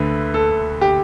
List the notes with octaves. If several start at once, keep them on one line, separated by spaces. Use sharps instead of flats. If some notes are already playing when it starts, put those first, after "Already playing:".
Already playing: D2 D3 A3 B4
A4
G4